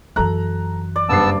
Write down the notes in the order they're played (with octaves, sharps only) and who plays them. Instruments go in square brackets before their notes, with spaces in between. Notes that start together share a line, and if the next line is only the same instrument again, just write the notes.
[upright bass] F#2 E3 [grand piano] A4 A#5 F#6
[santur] D5
[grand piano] F#1 G2 C7 [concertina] B3 A5 E6